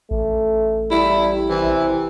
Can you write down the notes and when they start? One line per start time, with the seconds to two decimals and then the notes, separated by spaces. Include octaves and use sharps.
0.11 A1 A3
0.91 G3 E4
1.50 C3 E3